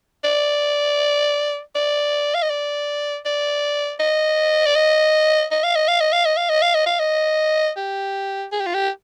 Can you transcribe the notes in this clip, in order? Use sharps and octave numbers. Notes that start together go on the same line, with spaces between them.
D5
D5
F5
D#5
D5
D5
D#5
D5
D#5
D#5
F5
D#5
F5
D#5
F5
D#5
F5
D#5
F5
D#5
F5
D#5
G4
G#4
G4
F4
G4